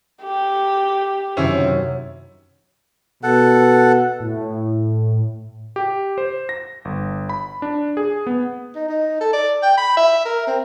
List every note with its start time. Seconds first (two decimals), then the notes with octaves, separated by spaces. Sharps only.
0.23 G4
1.37 F#2 C3 D#3 C4 C#4 E4
3.23 B2 A4 F#5
4.20 A2
5.76 G4
6.18 C5
6.49 A#6
6.85 G1
7.29 B5
7.62 D4
7.97 G#4
8.27 B3
8.75 D#4
8.89 D#4
9.21 A4
9.33 D5
9.62 G5
9.78 B5
9.97 E5
10.25 A#4
10.47 C4